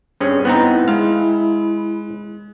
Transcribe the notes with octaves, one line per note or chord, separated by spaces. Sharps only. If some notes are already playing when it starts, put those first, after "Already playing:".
G2 C4 C#4 G#4
B3 C4 D#4 E4
G#3 F5